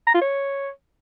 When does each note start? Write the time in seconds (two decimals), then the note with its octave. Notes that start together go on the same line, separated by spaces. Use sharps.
0.07 A#5
0.14 F4
0.21 C#5